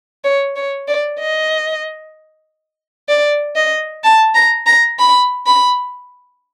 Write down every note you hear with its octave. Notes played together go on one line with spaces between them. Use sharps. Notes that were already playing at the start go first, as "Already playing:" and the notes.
C#5
C#5
D5
D#5
D5
D#5
A5
A#5
A#5
B5
B5